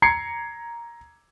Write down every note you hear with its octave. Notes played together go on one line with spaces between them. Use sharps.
A#5 G#6 C7 C#7